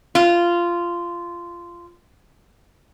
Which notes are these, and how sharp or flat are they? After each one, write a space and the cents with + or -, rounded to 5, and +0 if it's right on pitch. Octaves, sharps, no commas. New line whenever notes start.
F4 -15